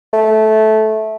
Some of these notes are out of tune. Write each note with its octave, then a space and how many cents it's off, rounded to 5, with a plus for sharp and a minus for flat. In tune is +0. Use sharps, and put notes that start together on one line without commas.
A3 -15